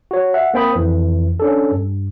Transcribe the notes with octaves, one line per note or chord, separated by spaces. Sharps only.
F#4 C#5
E5 F#5
A#3 C4 G5 B5 D#6
F2 E3
C#4 D4 A4
G2